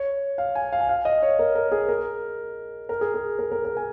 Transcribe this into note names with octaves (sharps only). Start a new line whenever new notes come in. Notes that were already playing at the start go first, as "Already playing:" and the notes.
Already playing: C#5
F5
G#5
F5
G#5
F5
D#5
C#5
A#4
A#4
G#4
A#4
A#4
G#4
G#4
A#4
A#4
A#4
G#5